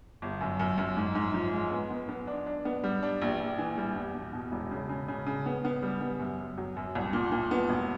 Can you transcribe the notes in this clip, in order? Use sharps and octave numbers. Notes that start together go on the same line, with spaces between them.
G1
F#2
F#2
F#2
G#2
G#2
F3
G#3
B3
B3
B3
D4
D4
B3
G3
D4
A#1
A#1
E3
G3
E2
B2
B2
E1
C#3
C#3
C#3
C#3
B3
B3
G3
B3
F#2
F#2
F#3
F#2
C2
A#2
A#2
B3
E1